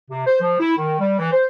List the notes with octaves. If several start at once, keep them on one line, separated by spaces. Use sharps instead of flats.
C3
C5
F3
E4
D#3
G3
E3
C5